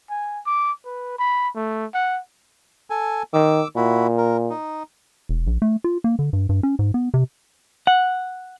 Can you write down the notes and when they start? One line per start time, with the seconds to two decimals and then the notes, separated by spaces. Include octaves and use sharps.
0.10 G#5
0.46 D6
0.86 B4
1.19 B5
1.56 A3
1.94 F#5
2.90 A4 G#5
3.33 D#3 D6 E6
3.76 A#2 E4 F#4
4.18 A#4
4.50 D#4
5.29 E1
5.47 A#1
5.62 A3
5.84 F4
6.04 A#3
6.19 D3
6.33 G2
6.49 G2
6.63 C#4
6.79 G#2
6.94 B3
7.14 C3
7.87 F#5